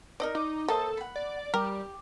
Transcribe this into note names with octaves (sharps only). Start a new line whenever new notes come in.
D#4 A#4 D5 D#5
D#4 D6
A#3 A4 C5 D#5 A5
F#5 B5
D5
G3 G4 A#4